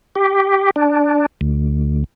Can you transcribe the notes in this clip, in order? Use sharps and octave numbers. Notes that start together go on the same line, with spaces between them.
G4
D4
D2